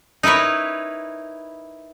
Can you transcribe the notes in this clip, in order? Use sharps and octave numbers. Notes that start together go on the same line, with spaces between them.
D#4 E4 A#4 B4 C#5